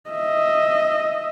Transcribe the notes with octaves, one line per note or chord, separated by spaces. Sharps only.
D#5 E5